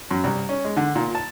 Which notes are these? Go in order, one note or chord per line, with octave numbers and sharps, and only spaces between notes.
F#2
C2
C#4
G#3
D3
A#2
A5